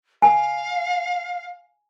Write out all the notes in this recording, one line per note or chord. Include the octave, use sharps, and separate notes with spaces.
F5 G#5